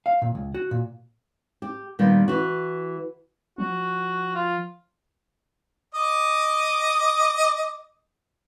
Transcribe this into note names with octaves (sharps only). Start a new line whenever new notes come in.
F5
A#2
C#2
F#4
A#2
G4
A#2 D#3 G3 A#3 B3
E3 F#4
F3 F#4
F4
D#5 D6 D#6